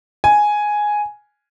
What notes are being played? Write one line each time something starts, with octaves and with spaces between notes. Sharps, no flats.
G#5